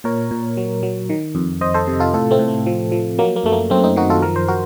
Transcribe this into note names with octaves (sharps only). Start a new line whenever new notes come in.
A#2 A#4 C#5
A#2
F#3
F#3
D#3
F2
F2 C5 D#5
A4 C5
C3
F4 A4
A2 F4 A4
A3 C4
A2
A3
F3
F3
F#3 A#3
A#3
F#2 A3
A#3
F#2 A3 C4
C4 D#4
D#3 D#4 F#4
F4 A4
F3 A#4
C5
F#4 A#4